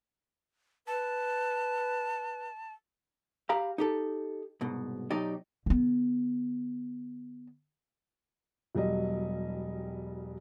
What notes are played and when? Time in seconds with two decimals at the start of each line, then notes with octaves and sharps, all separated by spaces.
0.87 B4 A5
3.49 G4 F5 A#5 B5
3.78 D#4 G4 A4
4.61 C2 G#2 B2
5.11 B2 F#3 D#4 G4 D5 D#5
5.66 D3 B3
8.75 E1 F#3 G3 D#5